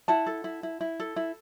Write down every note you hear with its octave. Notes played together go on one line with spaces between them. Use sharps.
E4 F#5 A5
A4
E4
E4
E4
A4
E4